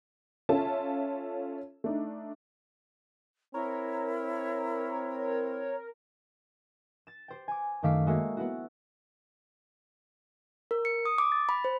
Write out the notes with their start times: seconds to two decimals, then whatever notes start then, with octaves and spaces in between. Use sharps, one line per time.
0.49 C#4 F4 A4 E5 A5
1.84 A3 D4 D#4
3.54 C4 E4 A#4 C#5
7.07 A6 E7
7.28 G4 C5 G5
7.48 G#5 D6
7.83 F#2 D#3 A3 F5 D6 B6
8.07 G#3 A#3 F#4 A4 C#5 E5
8.37 B3 E4 F#4
10.71 A#4
10.85 C#7
11.05 D#6
11.18 D6
11.32 A6
11.49 B5
11.64 C5